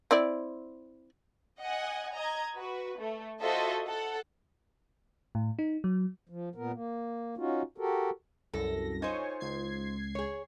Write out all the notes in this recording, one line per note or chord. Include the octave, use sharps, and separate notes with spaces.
C4 E4 D5
D#5 F#5 G#5
D#5 A#5 G#6
F#4 B4
A3
F4 F#4 A4 C5 D#5 E5
A4 F#5
A2
D#4
F#3
F3
A#2 B3 A#4
A#3
C#4 D#4 F4 F#4
F#4 G4 A4 A#4
C2 F#2 A4 A#6
D#4 F4 C5 C#5 G#5 C#6
C#2 G#6 C7
G#4 C#5